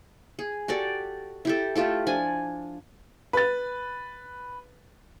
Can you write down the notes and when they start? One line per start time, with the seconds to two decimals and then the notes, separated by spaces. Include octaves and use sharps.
0.39 G#4
0.68 F#4 G4 A4 D5
1.45 E4 G4 A4
1.75 A3 F4 G4 A4
2.06 F3 D4 G#5
3.33 B4 A6